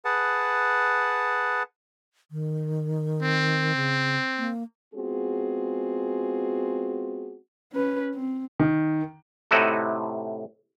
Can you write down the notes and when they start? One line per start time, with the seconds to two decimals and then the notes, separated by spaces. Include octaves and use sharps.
0.05 G#4 B4 F#5 A5
2.31 D#3
3.23 C4
3.76 C#3
4.38 A#3
4.95 G#3 B3 C4 F4 F#4 G#4
7.73 C#4 B4
8.15 C4
8.60 D#3
9.51 A2 C3 D#4 E4 F#4 A4